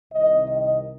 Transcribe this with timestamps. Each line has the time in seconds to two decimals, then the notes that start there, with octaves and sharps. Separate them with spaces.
0.12 C2 C3 D#3 D#5
0.48 D#5